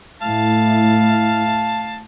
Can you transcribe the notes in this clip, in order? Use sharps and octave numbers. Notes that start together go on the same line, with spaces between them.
A2 E4 F5 A5